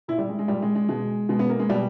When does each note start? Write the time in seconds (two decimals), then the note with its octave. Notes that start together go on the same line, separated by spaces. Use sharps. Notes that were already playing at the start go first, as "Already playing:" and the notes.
0.08 A#2 E4
0.18 G3
0.28 G#3
0.39 G#3
0.48 A#2 G3
0.62 G#3
0.75 G#3
0.89 B2 G#3
1.29 B2 G#3
1.39 B3
1.50 A#3
1.59 G#3
1.70 B2 G3